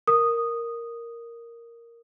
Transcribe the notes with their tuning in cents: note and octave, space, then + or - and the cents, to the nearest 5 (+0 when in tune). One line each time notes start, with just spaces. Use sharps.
A#4 +0 D#6 -5